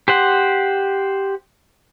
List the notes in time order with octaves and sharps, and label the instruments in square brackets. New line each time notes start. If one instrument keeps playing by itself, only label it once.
[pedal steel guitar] G4 C5 F#5